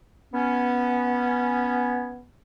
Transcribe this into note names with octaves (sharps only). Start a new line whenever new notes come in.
B3 C#4